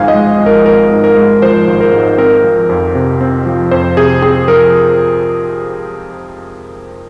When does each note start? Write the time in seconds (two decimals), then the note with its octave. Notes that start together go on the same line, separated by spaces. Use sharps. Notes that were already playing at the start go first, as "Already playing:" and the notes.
Already playing: G#1 G#2 F3 G#3 F5 G#5
0.08 D#5
0.14 G#3
0.40 F3
0.46 A#4
0.65 G#1 A#4
0.91 G#2
1.04 A#4
1.17 G#3
1.42 F3 C5
1.67 G#1
1.81 A#4
1.93 G#2
2.18 C4 A#4
2.44 F3
2.69 F2
2.95 C3
3.21 C4
3.46 F3
3.71 F2 C5
3.97 C3 G#4
4.22 C4 G#4
4.48 F3 A#4